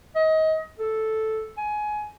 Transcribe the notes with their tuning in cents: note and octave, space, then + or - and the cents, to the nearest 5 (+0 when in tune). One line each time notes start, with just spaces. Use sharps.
D#5 +25
A4 -5
G#5 +20